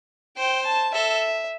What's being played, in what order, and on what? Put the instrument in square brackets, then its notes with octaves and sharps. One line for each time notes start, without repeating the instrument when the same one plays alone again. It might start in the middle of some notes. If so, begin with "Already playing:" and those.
[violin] C5 [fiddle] G5
[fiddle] A5
[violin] A4 [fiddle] E5